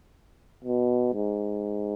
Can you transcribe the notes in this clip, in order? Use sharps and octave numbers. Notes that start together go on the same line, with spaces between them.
B2
G#2